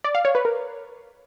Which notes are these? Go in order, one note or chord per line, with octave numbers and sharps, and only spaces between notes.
D5
F5
C#5
B4
A#4